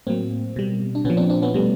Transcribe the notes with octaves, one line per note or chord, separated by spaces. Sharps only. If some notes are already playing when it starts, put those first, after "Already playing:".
A2 F#3 A#3 C4
B2 G3
D4
A#2 B3 C#4
F3
C4 D4
C4 D4
B3 C#4
B2 G3 A3 B3